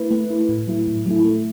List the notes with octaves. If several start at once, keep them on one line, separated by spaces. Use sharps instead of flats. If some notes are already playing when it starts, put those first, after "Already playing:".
Already playing: A3 E4 B4
A3
E4 B4
A2
F#3 A3 E4
A2
F#3 A3 E4
A3